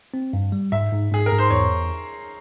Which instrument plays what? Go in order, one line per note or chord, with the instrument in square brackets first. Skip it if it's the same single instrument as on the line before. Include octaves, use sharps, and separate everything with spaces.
[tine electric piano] C4
G2
G3
[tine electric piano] G#2 [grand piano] E5
[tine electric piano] G#2
[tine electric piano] G#2 [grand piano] G#4
[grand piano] A#4
[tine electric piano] G#2
[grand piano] C5
[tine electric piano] E2 [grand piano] C#5